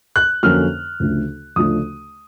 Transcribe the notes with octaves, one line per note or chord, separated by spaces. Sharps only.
F#6
F2 D3 F#3 A#3 C#4 F6
D2 C#3 F3 A3 D4
D2 C#3 F3 A3 D4 D#6